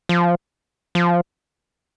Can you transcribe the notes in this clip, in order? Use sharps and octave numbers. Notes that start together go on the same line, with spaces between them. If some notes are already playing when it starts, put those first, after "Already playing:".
F3
F3